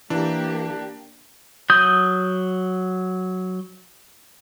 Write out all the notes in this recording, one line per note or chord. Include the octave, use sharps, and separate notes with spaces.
E3 A#3 D4 G4
F#3 D#6 G6